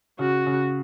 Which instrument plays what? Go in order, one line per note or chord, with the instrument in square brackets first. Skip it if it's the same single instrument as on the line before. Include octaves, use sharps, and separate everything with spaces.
[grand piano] C#3 [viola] F#4
[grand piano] C#3